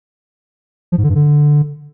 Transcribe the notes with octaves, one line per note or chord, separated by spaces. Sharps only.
F3
G#2
D3
G2
D3